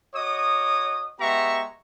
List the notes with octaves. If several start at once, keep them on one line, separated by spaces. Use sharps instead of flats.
F#4 C#5 D#5 D6 D#6
G#3 B3 G4 E5 A#5 C#6